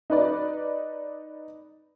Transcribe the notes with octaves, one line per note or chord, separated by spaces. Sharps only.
D#4 B4 D5